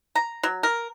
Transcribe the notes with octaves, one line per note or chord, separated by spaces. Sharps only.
A#5
F#3
A#4